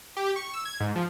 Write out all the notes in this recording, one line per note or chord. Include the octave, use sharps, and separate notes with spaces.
G4
C#6
E6
G#6
G#2
F3